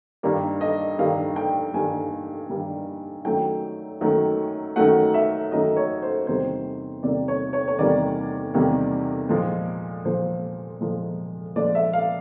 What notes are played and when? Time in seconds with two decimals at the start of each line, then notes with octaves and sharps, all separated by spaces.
0.23 G2 D#3 G3 A#3 D5
0.61 D#5
0.99 G2 D#3 G3 A#3 F5
1.36 G5
1.74 G2 D#3 G3 A#3 G#5
2.50 G2 D#3 G3 A#3
3.25 F#2 D#3 F#3 A3 G5
4.01 F#2 D#3 F#3 A3
4.76 F#2 D#3 F#3 A3 F#5
5.14 E5
5.52 F#2 D#3 F#3 A3 D#5
5.77 C#5
6.02 C5
6.27 E2 C3 D#3 G3 A#3 C5
7.03 E2 C3 D#3 G3 A#3 D5
7.28 C#5
7.53 C#5
7.68 C#5
7.78 E2 C3 D#3 G3 A#3 D5
8.54 E2 C3 D#3 G3 A#3
9.29 A#2 F3 G#3
10.05 A#2 F3 G#3 C5
10.81 A#2 F3 G#3
11.56 A#2 F3 G#3 D5
11.75 E5
11.93 F5